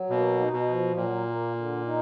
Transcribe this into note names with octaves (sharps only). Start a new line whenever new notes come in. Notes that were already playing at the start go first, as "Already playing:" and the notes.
Already playing: F#3
B2 A#3
D#4
B2
F3
A#2 F#3
A#3
D3
D#4